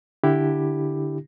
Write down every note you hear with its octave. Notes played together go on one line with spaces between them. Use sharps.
D3 D4 E4 G4